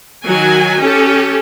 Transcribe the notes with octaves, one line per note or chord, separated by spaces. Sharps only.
D#3 F#3 F#4 G#5
C#4 G4 A4